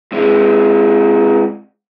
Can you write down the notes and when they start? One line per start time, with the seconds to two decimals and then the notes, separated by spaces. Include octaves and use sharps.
0.13 C3 G#3